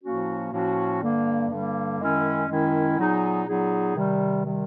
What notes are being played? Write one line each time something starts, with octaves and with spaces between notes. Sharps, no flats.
A2 F3 A#3 C#4 F#4
A2 F3 A#3 C#4 F#4
G2 D3 G3 A#3
G2 D3 G3 A#3
F#2 D#3 G#3 C#4 E4
F#2 D#3 G#3 C#4 E4
A#2 F#3 B3 D#4 G#4
A#2 F#3 B3 D#4 G#4
C3 D#3 G3
C3 D#3 G3